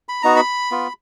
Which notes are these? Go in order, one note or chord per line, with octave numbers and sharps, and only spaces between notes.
B5
B3 D#4 F#4 A#5
B5
B3 F4